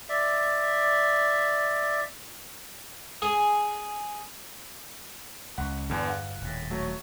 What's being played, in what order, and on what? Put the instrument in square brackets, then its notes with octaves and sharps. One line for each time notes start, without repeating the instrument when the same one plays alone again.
[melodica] D5 E5
[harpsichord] G#4
[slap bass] C#2 [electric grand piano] F#5
[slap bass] G1 [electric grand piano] E2 D3
[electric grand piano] F5 F#5
[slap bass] D#1 A2
[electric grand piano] F#3 A3